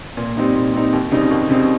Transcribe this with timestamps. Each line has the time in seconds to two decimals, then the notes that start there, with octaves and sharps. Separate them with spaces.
0.17 A#2
0.37 G3 C4 D#4
0.55 A#2
0.73 G3 C4 D#4
0.93 D#2
1.11 C#3 G3 C4 D#4
1.31 D#2
1.49 C#3 G3 C4 D#4